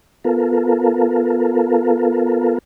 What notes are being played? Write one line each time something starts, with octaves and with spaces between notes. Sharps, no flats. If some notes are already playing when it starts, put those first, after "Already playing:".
B3 F4 A4 A#4